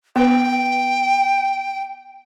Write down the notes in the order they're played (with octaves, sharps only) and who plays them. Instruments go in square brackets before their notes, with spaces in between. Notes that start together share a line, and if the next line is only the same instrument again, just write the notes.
[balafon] B3 B4 [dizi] G5